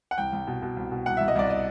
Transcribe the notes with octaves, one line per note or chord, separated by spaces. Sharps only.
F#5
C2 G5
C2
B2
B2
C2
B2
C2 F#5
E5
C2
D#5
C2 D5
D#5